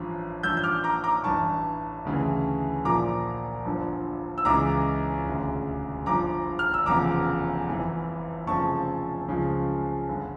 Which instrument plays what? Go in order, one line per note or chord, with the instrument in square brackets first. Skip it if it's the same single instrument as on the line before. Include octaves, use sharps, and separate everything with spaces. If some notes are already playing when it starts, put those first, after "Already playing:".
Already playing: [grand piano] A1 G2 F3
A1 G2 F3 E6 G6
G6
D6 F6
A#5 D6
A#5 D6
A1 G2 E3 A5 C#6
D2 C#3 E3
A#1 A#2 F3 A#5 D6
G1 G2 D3 F3
E6
C#2 C#3 E3 A#5 D6
E1 D2 C#3
G1 G2 F3 A#5 D6
F6
E6
F1 E2 C#3 F3 A#5 D6
G1 F2 E3
F1 F2 C#3 F3 A5 C#6
C#2 C#3 F3
G1 G2 D3